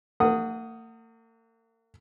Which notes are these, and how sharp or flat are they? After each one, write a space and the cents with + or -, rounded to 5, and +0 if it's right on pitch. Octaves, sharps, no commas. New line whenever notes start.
A#3 -45 F#5 +5 D#6 +0